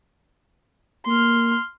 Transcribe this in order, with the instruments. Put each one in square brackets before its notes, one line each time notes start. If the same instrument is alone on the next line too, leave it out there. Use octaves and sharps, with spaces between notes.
[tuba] A#3 [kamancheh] C6 F6